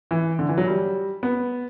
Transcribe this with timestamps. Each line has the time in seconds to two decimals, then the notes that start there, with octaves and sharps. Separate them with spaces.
0.11 E3
0.39 D3
0.49 E3
0.58 F#3
0.67 G3
1.23 B3